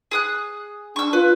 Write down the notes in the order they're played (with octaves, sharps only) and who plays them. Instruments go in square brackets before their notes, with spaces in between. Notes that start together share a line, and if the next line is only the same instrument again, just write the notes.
[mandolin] G#4 D#6 F#6
[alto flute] D4 [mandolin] C#6 E6
[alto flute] F4 [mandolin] B4